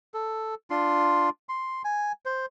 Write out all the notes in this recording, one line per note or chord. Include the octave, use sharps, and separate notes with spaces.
A4
D4 F4 C6
C6
G#5
C5